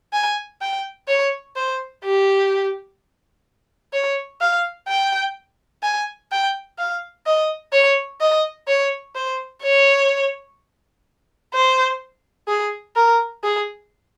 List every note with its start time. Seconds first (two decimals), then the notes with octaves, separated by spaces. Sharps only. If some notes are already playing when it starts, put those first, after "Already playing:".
0.13 G#5
0.61 G5
1.08 C#5
1.56 C5
2.04 G4
3.93 C#5
4.41 F5
4.88 G5
5.83 G#5
6.31 G5
6.78 F5
7.26 D#5
7.72 C#5
8.20 D#5
8.68 C#5
9.15 C5
9.63 C#5
11.53 C5
12.48 G#4
12.96 A#4
13.43 G#4